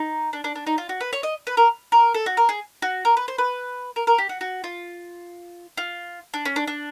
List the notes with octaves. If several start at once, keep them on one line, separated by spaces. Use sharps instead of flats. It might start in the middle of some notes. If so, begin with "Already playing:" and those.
Already playing: D#4
D4
D4
D4
D#4
F4
F#4
B4
C#5
D#5
B4
A#4
A#4
A4
F#4
A#4
G#4
F#4
A#4
B4
C5
B4
A#4
A#4
G4
F#4
F#4
F4
F4
D4
C#4
D4
D4